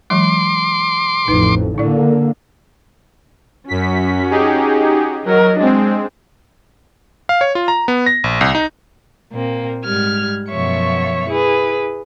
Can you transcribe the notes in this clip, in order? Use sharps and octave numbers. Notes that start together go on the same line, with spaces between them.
E3 F#3 G#3 C6 D6
A1 F2 D#4 B4
D3 A#3 E4 D5
F#2 C#4 F#4 B6
D#4 G4 G#4
F#3 A#4 D#5
G#3 C4 D4
F5
C#5
F4
A#5
B3
A#6
A#1
C2
D#4
A#2 A#3 C4
G#2 G3 F6 G#6
F#2 B2 F3 C#5 E5 C#6
E4 G#4 B4